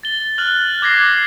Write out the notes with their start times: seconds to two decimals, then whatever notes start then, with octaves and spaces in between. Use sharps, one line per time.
0.03 A6 G7
0.38 F6 F#6 F#7
0.82 D6 G#6 A#6 C7